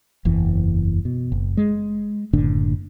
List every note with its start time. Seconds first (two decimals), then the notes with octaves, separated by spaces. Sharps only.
0.25 F#1 E2 E3
1.05 B2
1.32 F#1
1.57 G#3
2.33 F#1 A2 D3 D4